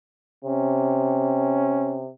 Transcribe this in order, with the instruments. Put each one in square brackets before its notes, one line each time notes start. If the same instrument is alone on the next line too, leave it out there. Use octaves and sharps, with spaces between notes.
[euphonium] C3 [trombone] C#4